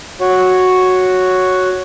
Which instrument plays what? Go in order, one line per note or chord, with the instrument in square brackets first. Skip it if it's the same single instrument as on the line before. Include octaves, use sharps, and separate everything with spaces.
[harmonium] F#4 C#5